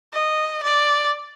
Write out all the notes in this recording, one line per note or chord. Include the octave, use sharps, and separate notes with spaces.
D#5
D5